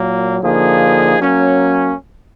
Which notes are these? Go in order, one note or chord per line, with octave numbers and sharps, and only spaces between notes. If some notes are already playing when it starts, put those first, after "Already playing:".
Already playing: A#2 F#3 A#3
D3 F3 A#3 D#4 G#4
F#3 A#3 C#4